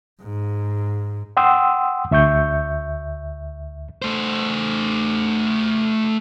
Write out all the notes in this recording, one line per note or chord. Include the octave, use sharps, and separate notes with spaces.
G#2
F#5 G5 C6 D#6 E6
D2 E5 C#6 G6
A3 C5